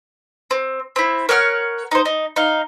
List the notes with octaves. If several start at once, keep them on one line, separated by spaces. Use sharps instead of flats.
C4
C4 E4
A#4 C#5 F#5 F6
D#4 C5
D#4
D#4 F5